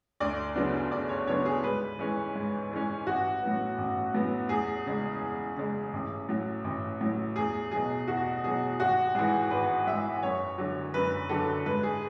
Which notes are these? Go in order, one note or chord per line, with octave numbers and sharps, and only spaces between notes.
D2 D5
C#3 F#3 B3 D4
D2 D5
C#5
C#3 F#3 B3 D4 C#5
G#4
G#2 B4
E3 G#3 C#4
G#2
E3 G#3 C#4
A1 F#4
A2 F#3 B3
A1
A2 F#3 B3
E2 G#4
C#3 G#3
E2
C#3 G#3
A1
A2 F#3
A1
A2 F#3
E2 G#4
B2 F#3 G#4
E2 F#4
B2 F#3 G#4
G#1 F#4
G#2 E3 G#4
G#1 B4
G#2 E3 E5
F#2 C#5
D3 F#3
F#2 B4
D3 F#3 A4
G#2 B4
G#4